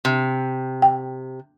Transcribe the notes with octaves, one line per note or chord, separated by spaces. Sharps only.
C3
G5